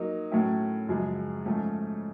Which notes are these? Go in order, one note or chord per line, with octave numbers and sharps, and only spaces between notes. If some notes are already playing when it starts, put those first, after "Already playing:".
Already playing: F#3 A#3 D#4
A2 F#3 A3 C#4 E4
F#2 C#3 F3 G#3
G#2 F3 A3 C#4